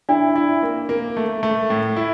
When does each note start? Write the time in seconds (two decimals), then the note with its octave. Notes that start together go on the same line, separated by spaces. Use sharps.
0.09 D4 E4 D5
0.36 E4
0.63 A#3
0.89 A#3
1.17 A3
1.43 A3
1.70 A2
1.97 E4